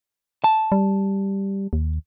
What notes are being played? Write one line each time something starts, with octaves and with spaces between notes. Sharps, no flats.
A5
G3
D#2